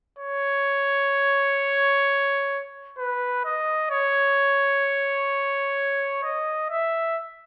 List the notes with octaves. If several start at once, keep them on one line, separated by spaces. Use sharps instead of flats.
C#5
B4
D#5
C#5
D#5
E5